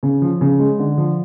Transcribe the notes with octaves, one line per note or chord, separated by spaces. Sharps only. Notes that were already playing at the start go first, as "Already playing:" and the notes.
C#3
F3
C#3
G#3
D3
F3